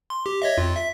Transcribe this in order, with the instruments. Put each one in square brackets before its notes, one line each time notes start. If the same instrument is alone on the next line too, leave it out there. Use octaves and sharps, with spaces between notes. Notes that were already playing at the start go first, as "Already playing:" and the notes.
[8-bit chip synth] C6
G4
C#5 D#5 E5
F2 F4
E5 B6